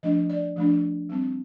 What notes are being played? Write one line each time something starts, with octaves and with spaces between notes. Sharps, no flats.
F3 A3 D4 D#5
D5
F3 A3 D4
G3 C4